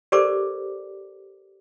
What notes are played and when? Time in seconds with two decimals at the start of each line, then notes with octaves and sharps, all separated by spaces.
0.12 G4 A4 A#4 C5 D5 D6